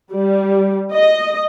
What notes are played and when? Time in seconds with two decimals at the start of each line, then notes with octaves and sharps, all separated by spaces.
0.13 G3
0.93 D#5